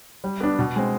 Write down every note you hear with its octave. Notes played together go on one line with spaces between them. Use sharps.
G3
B3 D4
B2
G#3 C4